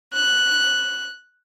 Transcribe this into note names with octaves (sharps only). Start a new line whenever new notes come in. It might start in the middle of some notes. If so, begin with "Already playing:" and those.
F#6